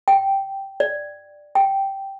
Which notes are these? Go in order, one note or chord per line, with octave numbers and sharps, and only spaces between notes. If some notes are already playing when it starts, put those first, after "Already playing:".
G5
D5
G5